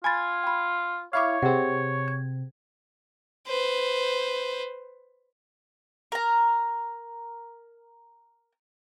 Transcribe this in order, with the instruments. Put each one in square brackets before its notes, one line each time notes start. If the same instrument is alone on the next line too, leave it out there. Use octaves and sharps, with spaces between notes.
[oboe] F4 [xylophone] G#5 B5 A6 [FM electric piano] G#6
[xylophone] G5 B5
[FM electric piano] E4 F5 [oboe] C#5 [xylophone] C#6 D6
[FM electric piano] C3 C4 [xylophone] G#4 F#5
[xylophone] G#6
[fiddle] B4 C5
[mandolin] A#4 A#5